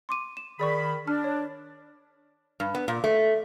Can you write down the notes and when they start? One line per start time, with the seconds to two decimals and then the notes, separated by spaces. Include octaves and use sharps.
0.09 C6 D6 D#7
0.37 E7
0.60 D#3 G#4 D5 B5 C#6
1.07 D4 A5 F6
1.24 C#5
2.60 G2
2.75 B3
2.88 A#2
3.04 A3